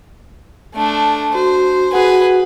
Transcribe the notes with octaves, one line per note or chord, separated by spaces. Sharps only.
A3 D4
F#4 C5
F#4 G#4 B4 F#5